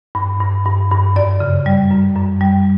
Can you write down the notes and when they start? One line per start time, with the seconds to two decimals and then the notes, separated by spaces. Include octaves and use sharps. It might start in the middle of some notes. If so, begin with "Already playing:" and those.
0.15 G2
0.40 G2
0.65 G2
0.91 G2
1.16 F#2 D5
1.40 C#3
1.66 G3
1.90 F#2
2.16 F#2
2.41 G3